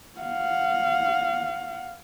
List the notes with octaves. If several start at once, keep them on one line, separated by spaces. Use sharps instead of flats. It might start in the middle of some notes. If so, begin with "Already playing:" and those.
F5 F#5